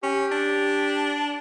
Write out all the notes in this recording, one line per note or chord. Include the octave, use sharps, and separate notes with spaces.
C#4 G4
D4